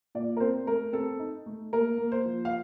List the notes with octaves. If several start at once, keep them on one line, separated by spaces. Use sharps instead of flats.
A#2 D5
A#4
C4 C5
A3 A#4
C4 A4
D#4
A3
A#3 A#4
A#3
C5
F3
F5